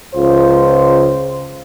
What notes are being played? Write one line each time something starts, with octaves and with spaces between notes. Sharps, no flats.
C#2 F4 C5